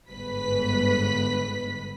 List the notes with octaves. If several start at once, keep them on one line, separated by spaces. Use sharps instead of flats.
G1 G#2 B4 B6